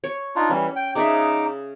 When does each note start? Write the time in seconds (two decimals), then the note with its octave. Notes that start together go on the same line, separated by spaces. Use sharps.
0.04 C#5
0.36 D4 D#4 F4
0.50 E3 G3 C#4
0.76 G5
0.95 C#3 D#4 D5 E5 D6